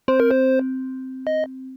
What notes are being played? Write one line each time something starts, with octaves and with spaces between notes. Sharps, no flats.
C4 C5
A#4
C5
D#5